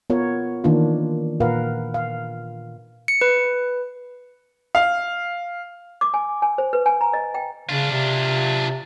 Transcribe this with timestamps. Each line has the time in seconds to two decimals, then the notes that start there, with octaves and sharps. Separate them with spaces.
0.10 B3 F4 A#4 C#5
0.64 D#3 E3 A#3 D4 F4
1.40 A#2 A#4 B4 F5 F#5
1.94 F5
3.08 C#7
3.21 B4
4.75 F5
6.01 D6
6.14 G#5
6.42 G#5
6.58 C5
6.73 B4
6.86 G#5
7.01 A#5
7.13 D#5
7.34 G5
7.69 C#3 D4 F4
7.92 C3